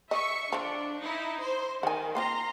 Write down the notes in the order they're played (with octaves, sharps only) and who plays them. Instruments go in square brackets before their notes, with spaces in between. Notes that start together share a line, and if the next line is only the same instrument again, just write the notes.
[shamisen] D#5 [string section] E5 C#6
[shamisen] D3 F3 [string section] D4
[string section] D#4 E4
C5
[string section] D#3 [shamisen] F#5 G#5
[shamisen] A#3 C4 F4 [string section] A#5 C6